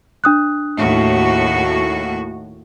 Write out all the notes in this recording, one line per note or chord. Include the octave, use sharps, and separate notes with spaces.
D4 D#6 F#6
D#2 A2 F#4